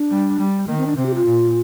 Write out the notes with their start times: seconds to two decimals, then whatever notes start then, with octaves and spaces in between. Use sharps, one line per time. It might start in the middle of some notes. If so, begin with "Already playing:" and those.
Already playing: D4
0.10 G3
0.39 G3
0.67 D#3 A#3
0.78 C4
0.87 D4
0.96 C3 C4
1.06 G4
1.15 F4
1.25 A#2